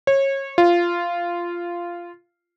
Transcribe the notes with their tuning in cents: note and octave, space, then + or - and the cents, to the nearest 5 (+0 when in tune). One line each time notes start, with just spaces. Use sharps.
C#5 -25
F4 -10